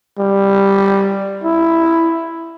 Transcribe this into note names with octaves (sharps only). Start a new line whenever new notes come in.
G3
E4